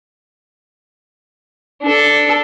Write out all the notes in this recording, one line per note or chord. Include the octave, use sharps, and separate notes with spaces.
D4 A4